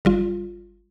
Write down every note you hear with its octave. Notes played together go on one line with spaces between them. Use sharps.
G1 G3 F4